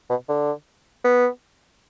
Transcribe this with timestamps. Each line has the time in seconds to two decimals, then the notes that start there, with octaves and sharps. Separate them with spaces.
0.09 B2
0.29 D3
1.04 B3